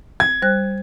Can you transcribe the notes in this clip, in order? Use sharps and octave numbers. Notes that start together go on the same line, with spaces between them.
G#6
G3 C5 F#6